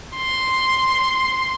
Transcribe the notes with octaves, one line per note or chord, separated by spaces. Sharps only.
C6